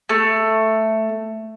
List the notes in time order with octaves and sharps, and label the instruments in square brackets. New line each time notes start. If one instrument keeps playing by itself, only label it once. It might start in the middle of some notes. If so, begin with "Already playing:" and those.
[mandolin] A3